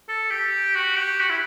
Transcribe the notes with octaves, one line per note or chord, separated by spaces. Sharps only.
A4
G4
F#4
G4
F#4
E4